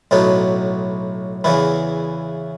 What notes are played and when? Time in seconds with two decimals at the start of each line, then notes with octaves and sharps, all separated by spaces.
0.11 B1 A2 F#3 B3 D#4
1.44 E2 C#3 E3 B3 E4